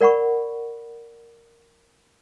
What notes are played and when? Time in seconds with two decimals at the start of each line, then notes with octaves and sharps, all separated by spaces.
0.01 A#4 D5 F#5 B5 C#6